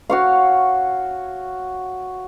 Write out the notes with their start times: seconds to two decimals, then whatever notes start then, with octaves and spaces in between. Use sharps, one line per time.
0.10 F#4 C#5 F5